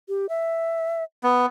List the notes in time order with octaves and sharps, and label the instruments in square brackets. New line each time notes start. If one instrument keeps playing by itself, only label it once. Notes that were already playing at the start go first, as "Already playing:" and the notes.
[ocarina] G4
E5
[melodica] B3